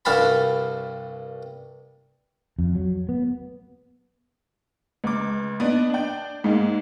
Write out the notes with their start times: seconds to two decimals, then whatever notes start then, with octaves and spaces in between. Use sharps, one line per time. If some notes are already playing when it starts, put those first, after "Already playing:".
0.05 C2 G2 F#4 F5 A5 B5
2.59 F2
2.75 F#3
3.09 B3
5.04 C#2 D6
5.60 B3 D4 D#4
5.90 D4 G5
6.44 G#2 G#3 A#3